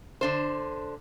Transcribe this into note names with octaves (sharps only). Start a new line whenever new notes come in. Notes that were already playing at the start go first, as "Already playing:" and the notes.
D3 D4 C5